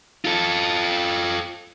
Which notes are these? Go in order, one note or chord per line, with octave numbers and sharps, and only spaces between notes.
F4 A4